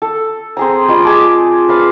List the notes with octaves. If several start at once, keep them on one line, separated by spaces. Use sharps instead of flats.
A4
C4 G#4 A#5
G3 F4 D#5
G#4 A5 D6
B4 D5 F5